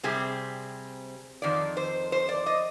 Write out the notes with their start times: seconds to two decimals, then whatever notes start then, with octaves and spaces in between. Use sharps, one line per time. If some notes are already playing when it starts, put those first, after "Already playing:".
0.03 C3 G3 C4 G#4
1.42 F2 D#3 D5
1.77 C5
2.12 C5
2.29 D5
2.46 D#5